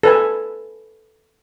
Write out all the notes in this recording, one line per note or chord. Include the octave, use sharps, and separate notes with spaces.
A4 B4 G#5